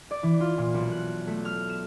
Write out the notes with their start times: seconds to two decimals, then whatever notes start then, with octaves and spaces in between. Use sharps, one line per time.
0.11 D5
0.23 E3
0.41 F4
0.58 A#2
0.74 B1
0.91 F#6
1.27 A3
1.45 F6
1.69 E7